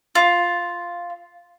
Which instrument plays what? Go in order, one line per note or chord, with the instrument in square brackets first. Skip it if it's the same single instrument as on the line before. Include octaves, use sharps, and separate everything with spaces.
[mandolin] F4